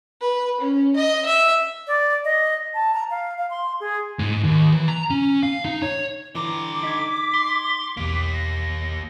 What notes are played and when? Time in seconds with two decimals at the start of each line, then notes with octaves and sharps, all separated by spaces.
0.21 B4
0.60 C#4
0.96 D#5
1.25 E5
1.87 D5
2.25 D#5
2.74 A5
2.94 A#5
3.11 F5
3.38 F5
3.50 C6
3.80 G#4
4.19 G#2
4.43 D#2
4.74 E3
4.88 A#5
5.10 C#4
5.43 F5
5.65 D#4
5.82 C#5
6.35 D3 E3 A#5 D6
6.83 D#4 G#6 B6
7.34 C6
7.97 B1 E2 A#3 G4 B6
8.34 A#6